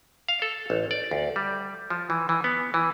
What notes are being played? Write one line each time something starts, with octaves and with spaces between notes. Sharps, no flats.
F5
A4
A1
D5
D2
G3
F3
E3
E3
B3
E3